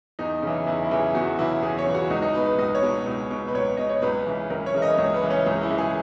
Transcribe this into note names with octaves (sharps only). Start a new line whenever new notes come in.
E2 D#4
C#3 E3
E2 E4
E4
C#3 E3
G#4
E2 F#4
C#3 E3 E4
E2 G#4
C#5
C#3 E3
F#4
C#2 D#4
D#4
B2 B4
B4
C#2 D#5
C#5
B2
C#2
B2
B4
C#2 C#5
B2 D#5
C#5
C#2 B4
C#3 E3
C#2 A#4
C#5
C#3 E3
D#5
C#2 C#5
B4
C#3 E3
C#4
C#2
E4
C#3 E3
G#4